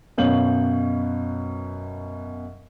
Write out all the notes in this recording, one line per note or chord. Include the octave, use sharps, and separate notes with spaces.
F#2 B2 C#5 F5 G6 F#7